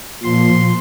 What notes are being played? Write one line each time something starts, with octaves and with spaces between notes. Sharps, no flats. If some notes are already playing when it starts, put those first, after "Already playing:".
A#2 F3 C6